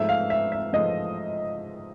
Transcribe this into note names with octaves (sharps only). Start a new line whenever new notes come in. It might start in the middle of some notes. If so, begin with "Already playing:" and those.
Already playing: G#2 F3 A3 E5
F5
E5
E5
G#2 F3 A3 D#5